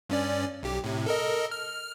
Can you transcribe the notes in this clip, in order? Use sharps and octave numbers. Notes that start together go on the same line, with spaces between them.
G2 C#4 D5
B1 G4
A2 C3
A4 A#4 D#5
F6